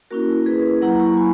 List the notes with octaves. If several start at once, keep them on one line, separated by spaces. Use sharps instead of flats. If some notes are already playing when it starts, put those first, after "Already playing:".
A#3 C#4 E4 F#4 A#4
G#4 B4
F#3 A#3 E4 F#5 A#5
A#5 C#6
G#5 B5